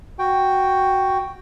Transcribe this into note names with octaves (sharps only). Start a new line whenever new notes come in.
F#4 G5